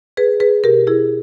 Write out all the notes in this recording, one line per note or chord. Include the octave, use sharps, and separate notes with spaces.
G#4 B4
G#4 B4
B2 G4 A#4
E4 G#4